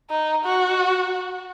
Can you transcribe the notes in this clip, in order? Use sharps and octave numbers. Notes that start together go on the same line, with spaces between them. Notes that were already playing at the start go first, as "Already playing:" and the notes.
D#4
F#4